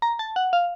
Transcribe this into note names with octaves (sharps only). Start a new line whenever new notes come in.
A#5
A5
F#5
F5